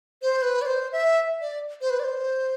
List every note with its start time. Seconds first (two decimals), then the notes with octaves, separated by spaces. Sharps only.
0.22 C5
0.42 B4
0.61 D5
0.66 C5
0.92 E5
1.41 D5
1.81 C5
1.90 B4
2.00 D5
2.04 C5